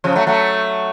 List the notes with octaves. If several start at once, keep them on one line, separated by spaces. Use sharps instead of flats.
C#3 F3
F#3 A3
F#3 A3